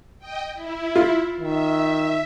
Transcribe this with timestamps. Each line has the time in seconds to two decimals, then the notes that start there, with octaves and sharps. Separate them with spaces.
0.19 D#5 G5
0.53 E4
0.96 F4
1.40 D#3 E5